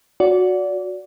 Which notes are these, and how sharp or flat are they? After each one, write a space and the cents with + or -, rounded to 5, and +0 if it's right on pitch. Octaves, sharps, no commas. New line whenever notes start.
F#4 -15 D5 -25